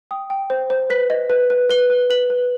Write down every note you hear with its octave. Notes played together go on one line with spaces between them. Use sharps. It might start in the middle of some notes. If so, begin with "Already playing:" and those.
G5 D#6
G5
C5
C5
B4 B6
D#5
B4
B4
B4 G7
B4
B4 F#7
B4